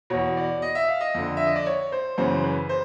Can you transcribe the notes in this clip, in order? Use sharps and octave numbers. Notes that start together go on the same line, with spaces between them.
E2 B2 C#5
D5
D#5
E5
F5
D#5
F2 D3
E5
D#5
D5
C#5
C5
F#2 C#3 E3 C5
B4
C5